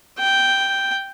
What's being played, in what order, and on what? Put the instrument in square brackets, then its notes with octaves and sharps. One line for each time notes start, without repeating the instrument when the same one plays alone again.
[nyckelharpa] G5